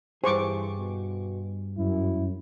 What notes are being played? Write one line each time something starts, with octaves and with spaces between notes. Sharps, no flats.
G2 E3 G#4 C5 C#6 D6
B2
F#2 E4